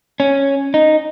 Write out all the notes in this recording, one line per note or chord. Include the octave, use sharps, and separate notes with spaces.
C#4
D#4